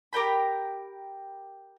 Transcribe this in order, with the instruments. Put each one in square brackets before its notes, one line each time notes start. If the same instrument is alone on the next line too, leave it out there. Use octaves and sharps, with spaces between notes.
[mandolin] G4 A#4 G5 B5